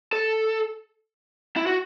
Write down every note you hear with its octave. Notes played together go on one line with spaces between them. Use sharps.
A4
E4
F#4